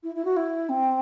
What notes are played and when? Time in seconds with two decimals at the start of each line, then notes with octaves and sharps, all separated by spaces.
0.03 E4
0.15 E4
0.25 F#4
0.36 E4
0.69 C4